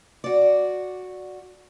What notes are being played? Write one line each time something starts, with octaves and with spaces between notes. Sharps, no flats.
F#4 D5